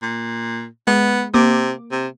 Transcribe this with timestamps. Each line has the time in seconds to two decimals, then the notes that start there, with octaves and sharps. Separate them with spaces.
0.02 A#2
0.87 G#3 B3
1.34 C3 A#3 D6
1.92 C3